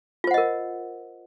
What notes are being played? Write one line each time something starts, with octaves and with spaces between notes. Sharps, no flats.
F4 A#4 C5 D#5 F#5